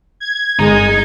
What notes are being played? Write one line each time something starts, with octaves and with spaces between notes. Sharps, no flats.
G#6
G1 G#3 D#4